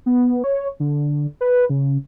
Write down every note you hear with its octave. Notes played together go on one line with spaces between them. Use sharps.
B3
C#5
D3
B4
C#3